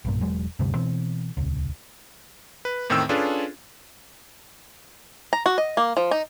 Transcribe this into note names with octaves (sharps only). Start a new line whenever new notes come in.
B1 G2 A#2
E1 F#3 G#3
D2 G2 C3
B2 E3 C4
D#1 C#2
B4
E2 A2 D#3 C4 G5 E6
C#4 D4 F4 G#4 A4 B4
A#5
F#4
D#5
A#3
F3
D#4